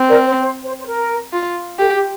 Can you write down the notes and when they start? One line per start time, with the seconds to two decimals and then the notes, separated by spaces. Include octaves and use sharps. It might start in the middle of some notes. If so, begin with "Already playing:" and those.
Already playing: C4
0.09 A#4 D5
0.25 C5
0.40 C5
0.63 C5
0.79 C5
0.86 A#4
1.33 F4
1.79 G4 A4
1.94 G4